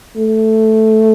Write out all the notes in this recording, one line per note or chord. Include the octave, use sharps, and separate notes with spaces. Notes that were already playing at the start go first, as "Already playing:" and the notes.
A3